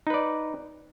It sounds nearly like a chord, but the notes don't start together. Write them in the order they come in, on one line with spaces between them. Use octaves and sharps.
D#4 B4 D5